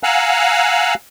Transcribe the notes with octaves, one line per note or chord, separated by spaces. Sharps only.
F5 F#5 G#5 A#5 E6 F#6